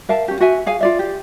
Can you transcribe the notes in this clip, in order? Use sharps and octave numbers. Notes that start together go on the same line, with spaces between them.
A#4 E5 F5 A5
C#4 G4
F#4 E5 G#5
G#4 F5 G#5
F4 D5 E5
G4